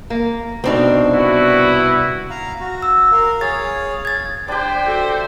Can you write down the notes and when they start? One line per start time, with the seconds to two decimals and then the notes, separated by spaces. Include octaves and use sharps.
0.10 A#3
0.64 C2 B2 C4 D4 D#4
1.14 B3 E4 F#4
2.30 F5 A#5
2.60 F#4
2.82 E6
3.12 A#4 F5
3.41 G#4 C#5 F5 A6
4.05 G#6 A6
4.48 D4 G4 C5 G5
4.85 F#4 A4 E5